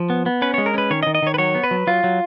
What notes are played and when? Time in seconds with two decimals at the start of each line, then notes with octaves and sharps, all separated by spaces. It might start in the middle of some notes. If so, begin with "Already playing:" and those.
Already playing: F3
0.10 B3
0.26 B3
0.42 C#4 B4
0.54 G#3 C#5
0.66 A#4
0.74 C#4 B4
0.90 D#3 C#5
1.03 D#5
1.07 D#3
1.15 D#5
1.22 D#3 C#5
1.34 B4
1.38 F#3 C#5
1.55 B3
1.64 B4
1.71 F#3
1.87 F#3 F4
2.04 F#3